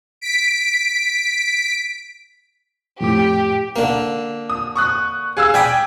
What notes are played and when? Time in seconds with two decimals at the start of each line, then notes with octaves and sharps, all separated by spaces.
0.21 B6 D7
3.00 F2 A2 G4 D6
3.76 D3 A#3
4.50 D#6
4.76 C#6 D#6 F#6
5.37 G#4 F5 E6
5.54 D5 G5 G#5 B5 D#6